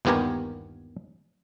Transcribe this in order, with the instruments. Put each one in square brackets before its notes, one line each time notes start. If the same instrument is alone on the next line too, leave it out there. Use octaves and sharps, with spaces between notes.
[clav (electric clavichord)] G1 D#2 B3 G4 A#4 G#5